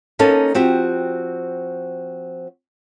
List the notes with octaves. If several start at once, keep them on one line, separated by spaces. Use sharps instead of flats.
A#3 B3 C#4 D#4 A4 A5
F3 C4 F#4 G4